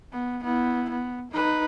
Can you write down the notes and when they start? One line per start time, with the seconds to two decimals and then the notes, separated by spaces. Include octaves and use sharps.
0.12 B3
0.44 B3 E4
0.90 B3
1.31 D#4 B4